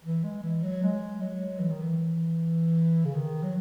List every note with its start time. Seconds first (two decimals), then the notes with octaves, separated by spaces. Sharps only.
0.05 E3
0.24 G#3
0.43 E3
0.63 F#3
0.83 G#3
1.21 F#3
1.60 E3
1.70 D#3
1.82 E3
3.05 C#3
3.15 D#3
3.43 F#3